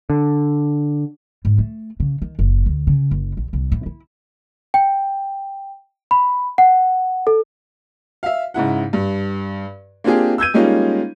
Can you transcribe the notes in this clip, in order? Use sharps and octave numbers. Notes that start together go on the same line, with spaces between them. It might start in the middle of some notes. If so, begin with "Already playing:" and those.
D3
G#2
A3
C#3
D#3
F#1
D2
C#3
F#1
A#1
C2
A2
E4
G5
B5
F#5
A4
E5 F5
G#2 C#3 E4 F#5
G2
A#3 C4 D4 F4 G4 G#4
E6 G6 G#6 D#7
G3 G#3 A#3 C#4 D#4 F4